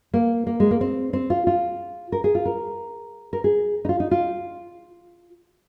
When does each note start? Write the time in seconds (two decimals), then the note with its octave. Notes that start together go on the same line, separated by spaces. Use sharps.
0.14 A#3
0.47 A#3
0.60 G#3
0.71 A#3
0.81 C4
1.13 C4
1.30 F4
1.47 F4
2.12 A#4
2.24 G#4
2.35 F4
2.45 A#4
3.33 A#4
3.44 G#4
3.85 D#4
3.89 F4
4.00 D#4
4.11 F4